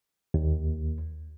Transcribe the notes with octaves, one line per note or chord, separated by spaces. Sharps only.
D#2